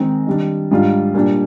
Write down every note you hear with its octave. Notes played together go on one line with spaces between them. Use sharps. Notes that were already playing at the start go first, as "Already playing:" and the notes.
Already playing: D#3 G#3 C4 D#4
D#3 G3 D4
G#2 G3 D4 F4
A#2 G3 D4